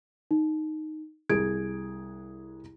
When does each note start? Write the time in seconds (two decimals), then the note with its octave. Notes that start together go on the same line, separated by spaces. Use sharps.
0.31 D#4
1.30 C2 G#4 G#6 D7